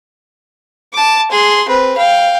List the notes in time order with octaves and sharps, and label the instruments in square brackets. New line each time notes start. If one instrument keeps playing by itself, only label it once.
[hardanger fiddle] A5 D6
G#4 C6
C4 B4
F5 G5